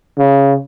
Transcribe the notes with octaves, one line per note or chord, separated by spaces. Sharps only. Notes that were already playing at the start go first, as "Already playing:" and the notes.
C#3